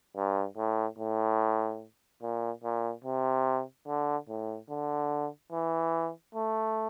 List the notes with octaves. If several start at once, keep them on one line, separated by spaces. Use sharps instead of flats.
G2
A2
A2
A#2
A#2
C3
D3
A2
D3
E3
A3